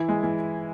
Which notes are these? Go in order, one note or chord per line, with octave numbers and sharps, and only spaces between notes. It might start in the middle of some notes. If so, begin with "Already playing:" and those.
Already playing: E3 E4
G#3
E3